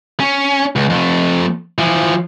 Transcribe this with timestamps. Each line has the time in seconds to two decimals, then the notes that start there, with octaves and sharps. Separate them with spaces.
0.20 C#4
0.76 C#2
0.90 F2 A3
1.78 E3 F3